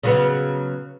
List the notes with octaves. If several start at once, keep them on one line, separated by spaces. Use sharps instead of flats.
C#3 F#3 B3